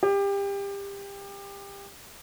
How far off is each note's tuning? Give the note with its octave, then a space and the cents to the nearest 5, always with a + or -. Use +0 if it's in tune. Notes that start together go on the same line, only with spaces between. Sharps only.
G4 +25